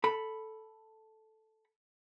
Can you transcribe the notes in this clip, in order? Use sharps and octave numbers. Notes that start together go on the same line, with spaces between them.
A4 B5